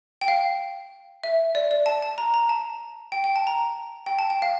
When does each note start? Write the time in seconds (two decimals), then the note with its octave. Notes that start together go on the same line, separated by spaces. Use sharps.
0.21 G5
0.28 F5
1.24 E5
1.55 D5
1.71 D5
1.86 A5
2.02 A5
2.18 A#5
2.34 A#5
2.49 A5
3.12 G5
3.24 G5
3.36 A5
3.47 A#5
4.06 G5
4.19 A5
4.30 G5
4.42 F5